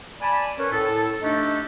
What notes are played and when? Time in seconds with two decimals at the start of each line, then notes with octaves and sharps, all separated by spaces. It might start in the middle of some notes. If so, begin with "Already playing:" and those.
0.22 D5 G#5 A5 B5
0.59 C#4 A#4 B4 C#5
0.72 A2 A4
1.22 A3 D4 D#4 G4 A4 D#5